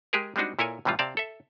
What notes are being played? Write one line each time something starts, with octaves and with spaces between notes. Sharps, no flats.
G#3 G4 G#4 A#4
G3 G#3 C4 D4 D#4 F#4
A#2 E4 A4 A#4 C#5 G#5
A2 C3 E3 G3 F4
C3 C4 D5 F5 A5
A4 E5